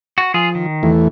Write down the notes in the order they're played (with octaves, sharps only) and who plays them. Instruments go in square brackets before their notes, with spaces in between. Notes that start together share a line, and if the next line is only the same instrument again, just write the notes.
[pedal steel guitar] F#4
[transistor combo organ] F3 [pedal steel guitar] F4 G#4
[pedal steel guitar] D#3
[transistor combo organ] E2 E3 A3